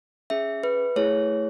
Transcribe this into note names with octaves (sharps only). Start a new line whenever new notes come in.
C#4 G#4 E5
B4
A3 E4 G#4 C#5